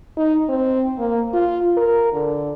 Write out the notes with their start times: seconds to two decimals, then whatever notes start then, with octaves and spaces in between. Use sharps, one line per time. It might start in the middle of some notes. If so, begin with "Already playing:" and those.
0.17 D#4
0.49 C4
0.98 A#3
1.33 F4
1.77 A#4
2.13 D3